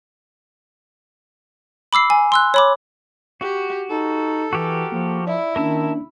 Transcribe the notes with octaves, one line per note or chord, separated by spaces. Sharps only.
B5 D6 E6 C7
G#5
C6 E6 F#6
C#5 B5 D6
F#4 G4
D#4 A4
E3 F#4 G4 A#4
F3 A#3
E4 D5
D#3 A#3 C#4 D4 A#4 A5 E6